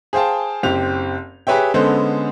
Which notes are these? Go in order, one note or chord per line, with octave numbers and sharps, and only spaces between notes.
G#4 C5 F5 G5 A5
F#1 C4 G4 F7
G4 G#4 B4 C#5 E5 G5
D3 G#3 B3 C#4 A4 C5